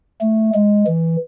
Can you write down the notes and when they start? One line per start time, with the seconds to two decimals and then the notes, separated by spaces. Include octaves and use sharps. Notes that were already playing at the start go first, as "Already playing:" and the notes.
0.21 A3
0.54 G#3
0.87 E3